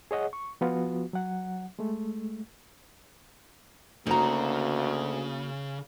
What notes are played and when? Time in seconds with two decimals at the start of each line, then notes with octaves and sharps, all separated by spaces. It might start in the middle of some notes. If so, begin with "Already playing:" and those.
0.11 G#4 C#5 D#5 F#5
0.33 C#6
0.61 F3 B3 F4 F#4
1.13 F#3 F#5
1.79 G#3 A3
4.07 D2 C#3 A#3 D#4 F#4 A#5